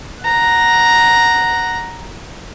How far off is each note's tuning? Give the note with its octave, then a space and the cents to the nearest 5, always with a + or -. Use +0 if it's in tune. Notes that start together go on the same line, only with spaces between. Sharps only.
F#5 +0 A#5 +0